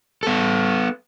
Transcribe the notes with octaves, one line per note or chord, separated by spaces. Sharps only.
B3 A4